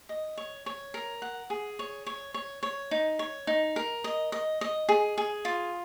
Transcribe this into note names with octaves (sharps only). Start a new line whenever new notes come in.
D#5
C#5
C#5
A#4
F#5
G#4
C#5
C#5
C#5
C#5
D#4
C#5
D#4
A#4
D#5
D#5
D#5
G#4
G#4
F4